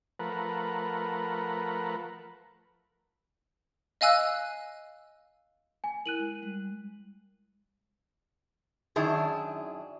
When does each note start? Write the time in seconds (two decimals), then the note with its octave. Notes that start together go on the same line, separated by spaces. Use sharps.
0.19 F3 A3 A#4 B4 F#5
4.01 D#5 F5 G#5 E6 F#6
5.84 G#5
6.06 E4 A#4 F#6 D#7 F#7
6.20 G#3
6.42 G3 G#3
8.96 F#2 D#3 D4 E4 G#4